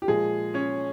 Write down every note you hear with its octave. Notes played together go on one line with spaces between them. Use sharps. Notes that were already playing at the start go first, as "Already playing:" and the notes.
G4
A#2 F3 G#3 G#4
C#4 C#5